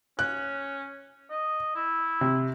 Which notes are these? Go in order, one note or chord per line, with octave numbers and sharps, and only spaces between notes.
C#4 F#6
D#5
E4
C3